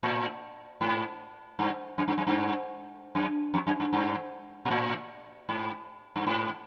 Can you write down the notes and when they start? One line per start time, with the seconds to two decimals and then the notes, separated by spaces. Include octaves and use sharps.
0.03 A2
0.81 G#2
1.59 G2
1.98 F#2
2.08 G2
2.18 F#2
2.27 G2
3.15 F#2
3.54 F2
3.67 F#2
3.80 G2
3.93 G2
4.65 A#2
4.71 A2
5.49 G#2
6.16 G2
6.27 G#2